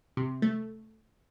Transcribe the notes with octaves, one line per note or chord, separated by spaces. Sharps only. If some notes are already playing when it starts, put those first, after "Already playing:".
C3
A3